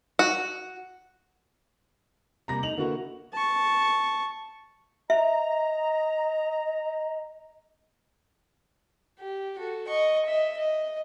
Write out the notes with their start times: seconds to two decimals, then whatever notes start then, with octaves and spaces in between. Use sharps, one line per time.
0.19 F#4
2.48 C3 G3 A#3 A#5 A#6
2.63 A3 D#4 F7 F#7
2.77 D3 A#3 B3 E4 F#4
3.33 A5 C#6
5.10 D#5 E5 A#5
9.19 G4
9.58 F#4 A4
9.87 D#5 C#6
10.26 D#5 E5
10.57 D#5